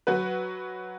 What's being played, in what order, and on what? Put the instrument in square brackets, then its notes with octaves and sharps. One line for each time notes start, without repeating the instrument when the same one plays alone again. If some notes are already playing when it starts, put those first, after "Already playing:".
[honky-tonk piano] F#3 F#4 B4